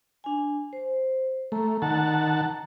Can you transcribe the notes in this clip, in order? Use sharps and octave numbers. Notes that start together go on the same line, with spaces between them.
D4 G#5
C5
A3 A#5
D#3 F#5 A5